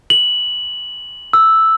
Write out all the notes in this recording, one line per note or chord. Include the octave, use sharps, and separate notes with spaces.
F#7
E6